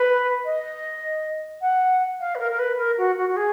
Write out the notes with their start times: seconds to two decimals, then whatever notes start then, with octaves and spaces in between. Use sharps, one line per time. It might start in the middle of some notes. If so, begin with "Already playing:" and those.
Already playing: B4
0.45 D#5
1.62 F#5
2.20 F5
2.35 B4
2.39 A#4
2.51 A#4
2.59 B4
2.78 A#4
2.98 F#4
3.17 F#4
3.29 F#4
3.37 G#4